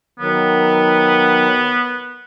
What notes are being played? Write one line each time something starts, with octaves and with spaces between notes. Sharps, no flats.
D#3 F#3 B3